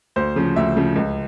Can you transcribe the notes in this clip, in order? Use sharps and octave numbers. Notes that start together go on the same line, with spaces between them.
D2 C5
C#3 F3
D2 E5
C#3 F3
C#2